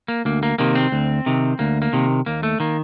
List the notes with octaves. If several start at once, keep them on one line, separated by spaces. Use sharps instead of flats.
A#3
D2 A#3
A#3
C3 D#3 A#3
C4
D2
C3 D#3
D2 A#3
A#3
C3 D#3
D#2 A#3
A3
D#3 A#3